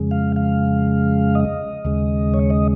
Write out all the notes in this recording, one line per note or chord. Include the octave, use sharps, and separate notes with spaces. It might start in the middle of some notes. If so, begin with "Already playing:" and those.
Already playing: F2 C#3 G#3
F5
F5
D#5
D#2 C#3 G#3
C#5
D#5